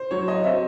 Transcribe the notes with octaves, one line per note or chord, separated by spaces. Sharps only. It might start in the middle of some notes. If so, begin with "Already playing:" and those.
Already playing: C5
F#3 C#5
D#5
C4 E5